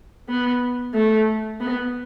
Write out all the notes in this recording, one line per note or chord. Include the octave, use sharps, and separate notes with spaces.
B3
A3
B3